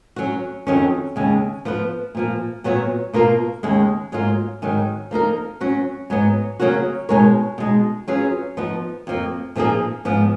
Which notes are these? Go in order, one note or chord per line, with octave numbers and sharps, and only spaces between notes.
F#3 C#4 F#4
F2 D#3 F#3 C#4
D#2 C#3 G#3
F3 B3 F4 B4
A#2 F3 A#3
A#2 F#3 B3 F#4 C#5
B2 A#3 F4 A#4
D#2 C#3 G#3
G#2 F#3 A#3 F4
G#2 D#3 F#3
F3 A#3 D#4 A#4
F#3 C#4 F#4
G#2 F#3 B3
C#3 F#3 A#3 C#4 F#4
B2 G#3 D#4 A#4 C#5
B2 G#3 D#4
F#3 C#4 F4 G#4 B4
F3 B3 D#4
F2 F3 A#3
A#2 F3 A#3 D#4 G#4
G#2 F3 B3